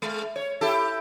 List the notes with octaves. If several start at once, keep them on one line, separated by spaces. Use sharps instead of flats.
G#3
C#5
E4 G4 A4